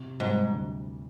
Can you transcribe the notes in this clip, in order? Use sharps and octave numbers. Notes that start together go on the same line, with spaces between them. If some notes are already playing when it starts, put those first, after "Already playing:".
Already playing: C3
G#2 G3
D2